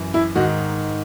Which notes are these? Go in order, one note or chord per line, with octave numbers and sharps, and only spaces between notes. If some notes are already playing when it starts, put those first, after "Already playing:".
Already playing: F#2 E3
E4
G#2 D#3 F#4